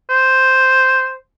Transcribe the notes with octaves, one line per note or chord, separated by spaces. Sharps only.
C5